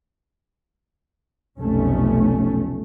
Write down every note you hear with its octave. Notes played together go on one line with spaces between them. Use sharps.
F1 B1 A3 C#4